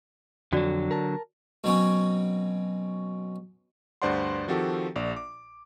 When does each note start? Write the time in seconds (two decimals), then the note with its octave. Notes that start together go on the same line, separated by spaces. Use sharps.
0.53 F2 D3 F#3 F#4 D5
0.91 A#4 A5
1.64 B2 F#3 C4 C#4
4.02 D2 G2 C5 D5 F#5 C6
4.48 D#3 F3 C4 F#4 G4 A4
4.96 A#1 D5
5.16 D6